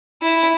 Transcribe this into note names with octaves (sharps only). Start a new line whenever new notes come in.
E4